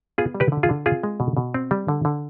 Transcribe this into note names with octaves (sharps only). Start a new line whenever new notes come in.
B3 F4 G#4
G3
G4 B4
D3
F4 G#4
D3
C4 F4 G#4
G#3
B2
B2
C4
G3
D3
D3